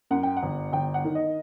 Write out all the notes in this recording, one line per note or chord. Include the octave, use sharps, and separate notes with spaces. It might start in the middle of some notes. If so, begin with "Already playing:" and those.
F#2 F#5
G5
F#5
G1
G1 G5
F#5
D#3
D#5